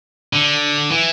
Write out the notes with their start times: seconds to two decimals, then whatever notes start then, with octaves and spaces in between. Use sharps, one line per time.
0.33 D3
0.91 E3